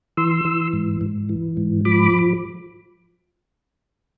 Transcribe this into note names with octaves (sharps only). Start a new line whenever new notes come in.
E3 C6 E6
E3
G#2
G#2
E3
G#2
F3 B5 D6